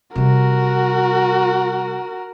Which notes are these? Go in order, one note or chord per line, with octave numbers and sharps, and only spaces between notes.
C3 G3 F#4 A#4